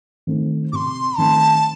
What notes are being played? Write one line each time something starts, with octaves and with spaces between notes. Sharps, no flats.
D#3 A3 C4
C3 C6 D6
D#3 A3 C4 A5